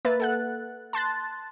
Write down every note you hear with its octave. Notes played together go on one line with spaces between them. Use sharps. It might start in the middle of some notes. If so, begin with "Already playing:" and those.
A#3 B4 E5 A6
A4 F#5 F#6
A5 C6 F#6 A6